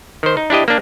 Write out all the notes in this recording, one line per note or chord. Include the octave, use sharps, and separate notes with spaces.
D#3 C5
D#4
D4 E4 G4 D#5
A#3 D4